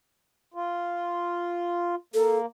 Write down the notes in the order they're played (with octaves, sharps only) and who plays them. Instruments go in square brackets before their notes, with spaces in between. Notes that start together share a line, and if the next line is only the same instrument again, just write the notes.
[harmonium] F4
[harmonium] A#3 [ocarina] A4